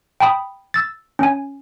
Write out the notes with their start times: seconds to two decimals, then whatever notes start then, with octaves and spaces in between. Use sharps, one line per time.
0.20 G5 A5 B5 D#6
0.74 E6 A6
1.19 C#4 G#5